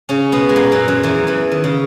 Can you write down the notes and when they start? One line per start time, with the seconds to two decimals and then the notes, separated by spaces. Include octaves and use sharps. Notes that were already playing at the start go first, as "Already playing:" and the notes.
0.09 C#3 C#4
0.32 B2 B3
0.49 G#3
0.56 A#2 A#3
0.72 F#2 F#3
0.88 F#2 F#3
1.03 E2 E3
1.27 E2 E3
1.52 D#3
1.64 C#3